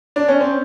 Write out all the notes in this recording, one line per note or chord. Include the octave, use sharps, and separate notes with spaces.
D4
C#4
C4